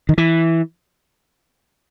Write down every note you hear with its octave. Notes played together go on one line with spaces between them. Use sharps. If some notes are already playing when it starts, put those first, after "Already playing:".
D#3
E3